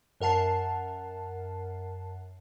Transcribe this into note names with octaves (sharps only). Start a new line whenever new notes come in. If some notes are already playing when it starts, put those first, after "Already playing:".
F#2 A#4 F#5 A5 C7